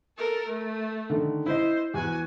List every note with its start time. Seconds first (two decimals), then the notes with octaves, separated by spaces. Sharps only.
0.17 A4 A#4
0.47 A3
1.10 D3 D#3
1.46 E4 C5 D#5
1.94 E2 F#4 G#5